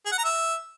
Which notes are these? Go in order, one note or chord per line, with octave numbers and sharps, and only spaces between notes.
G#4
F#5
A#5
E5